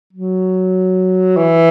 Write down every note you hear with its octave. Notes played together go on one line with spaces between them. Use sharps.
F#3
E3